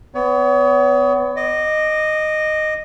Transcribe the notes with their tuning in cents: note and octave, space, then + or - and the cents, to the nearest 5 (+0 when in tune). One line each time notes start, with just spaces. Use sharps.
B3 +25 C#5 +40
D#5 -10 D6 +15